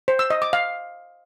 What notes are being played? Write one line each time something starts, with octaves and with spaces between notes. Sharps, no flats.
C5
E6
D#5
D6
F5